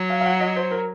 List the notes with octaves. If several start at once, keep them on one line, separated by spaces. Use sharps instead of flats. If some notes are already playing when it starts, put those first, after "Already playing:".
Already playing: F#3
F5
F5
F#5
D#5
C5
A#4